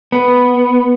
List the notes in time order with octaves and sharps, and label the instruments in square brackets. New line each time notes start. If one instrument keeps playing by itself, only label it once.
[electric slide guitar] B3